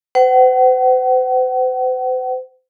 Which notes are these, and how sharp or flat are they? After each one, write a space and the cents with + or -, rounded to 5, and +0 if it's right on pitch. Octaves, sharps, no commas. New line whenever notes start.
C5 -40 F#5 +35